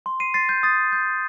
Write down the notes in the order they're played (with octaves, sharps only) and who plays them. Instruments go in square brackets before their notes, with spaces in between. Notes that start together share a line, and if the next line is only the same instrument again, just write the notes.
[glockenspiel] C6
C7 D#7
C6 A6 C7
G6
D#6 A6
G6